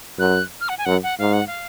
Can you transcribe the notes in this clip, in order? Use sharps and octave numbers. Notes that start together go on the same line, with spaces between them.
F#2 F#6
F6
F#5
G#5
F#2 F#5
F#5
G#2 F5
F#5
F5